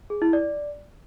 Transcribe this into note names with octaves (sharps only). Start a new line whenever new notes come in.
G#4
E4
D5